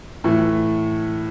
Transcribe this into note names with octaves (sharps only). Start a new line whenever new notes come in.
A2 E3 A3